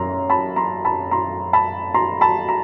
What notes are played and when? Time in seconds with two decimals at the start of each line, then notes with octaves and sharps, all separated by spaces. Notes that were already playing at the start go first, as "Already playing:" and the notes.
Already playing: F#2 F#3 A#5 C6
0.30 A5 B5
0.56 A#5 C6
0.85 A5 B5
1.11 A#5 C6
1.53 A5 B5
1.94 A#5 C6
2.21 A5 B5
2.49 A#5